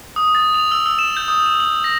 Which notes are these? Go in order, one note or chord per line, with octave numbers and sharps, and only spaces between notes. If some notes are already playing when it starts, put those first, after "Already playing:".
D#6
A6
F7
E6
E6
E7
G6
D#6
E7
F#7
A#6